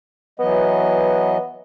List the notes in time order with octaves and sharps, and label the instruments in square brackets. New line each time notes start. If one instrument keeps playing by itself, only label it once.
[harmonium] E3 F#3 D#5 [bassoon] B3